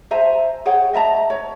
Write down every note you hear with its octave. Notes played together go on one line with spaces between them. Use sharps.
C5 E5 G#5 A#5
G#4 C#5 F#5 G5
D#5 E5 A5 A#5
C#5